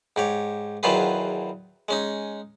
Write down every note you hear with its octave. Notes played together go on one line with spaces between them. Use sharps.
G#2 G4 C#5
E2 D#3 F#3 F4 G#4 B4
G#3 C#4 D#4